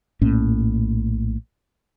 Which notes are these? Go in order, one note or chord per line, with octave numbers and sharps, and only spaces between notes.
A#1 A2 A#3 C#4